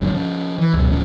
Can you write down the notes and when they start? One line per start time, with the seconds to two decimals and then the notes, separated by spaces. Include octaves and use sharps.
0.01 F#1 F#2 A#2 D3
0.14 F3 C#4
0.58 E3
0.74 C#2 F#2 B2
0.90 D1 D2 F3 C#4